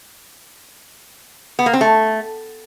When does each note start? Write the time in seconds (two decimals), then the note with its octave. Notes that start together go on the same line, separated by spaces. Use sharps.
1.59 B3
1.66 A#3
1.73 C4
1.81 A3